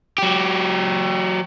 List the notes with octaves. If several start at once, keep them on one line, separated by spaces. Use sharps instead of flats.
F#3 G4